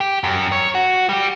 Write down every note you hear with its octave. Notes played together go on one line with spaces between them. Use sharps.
G4
F#2
C#5
F#4
G3 G4